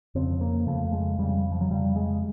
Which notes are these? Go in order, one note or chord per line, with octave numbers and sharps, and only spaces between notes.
F2 C#3 C4
A#3
F2 C#3 A3
G#3
F2 C#3 G3
F3
F#3
F2 C#3 G3
G#3